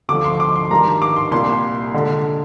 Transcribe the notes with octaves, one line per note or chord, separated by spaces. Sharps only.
D2 D3 F3 D6
C6
D6
C6
G2 D#3 G3 A#5
D6
C6
C2 A#2 G3 C6
D3 G#3